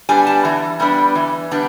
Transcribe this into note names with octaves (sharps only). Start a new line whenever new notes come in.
G3 B3 D4 G#5
A5
E3
G3 B3 D4
E3
G3 B3 D4